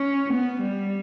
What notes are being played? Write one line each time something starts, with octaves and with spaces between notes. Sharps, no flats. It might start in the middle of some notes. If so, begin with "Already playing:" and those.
Already playing: C#4
B3
G3